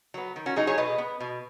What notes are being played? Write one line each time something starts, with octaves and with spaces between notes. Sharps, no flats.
F#3 B3
D#3
C#4 F#4
F#3 B3 D#4 G#4
G#4 C#5
B2 B4 D#5
B3
B2